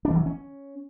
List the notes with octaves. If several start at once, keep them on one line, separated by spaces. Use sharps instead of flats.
D4
E3
F#3
E3
C#4